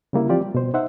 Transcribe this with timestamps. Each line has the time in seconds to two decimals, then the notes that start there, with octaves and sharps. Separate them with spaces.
0.13 C#3 G3 A#3 E4
0.29 E3 F3 C4 F4 G4 D5
0.41 G3
0.55 B2 C5
0.74 D#4 C5 E5 F#5